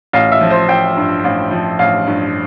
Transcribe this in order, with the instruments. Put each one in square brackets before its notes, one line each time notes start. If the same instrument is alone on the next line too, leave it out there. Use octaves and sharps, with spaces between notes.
[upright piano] A1 F5
E5
F3
C5
A1 G5
G2
A1 F5
F3
A1 F5
G2